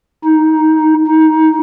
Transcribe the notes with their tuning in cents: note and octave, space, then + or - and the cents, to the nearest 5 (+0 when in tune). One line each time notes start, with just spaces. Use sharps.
D#4 +15
D#4 +20